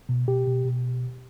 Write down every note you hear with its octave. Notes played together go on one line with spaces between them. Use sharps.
B2
B2 G4
B2
B2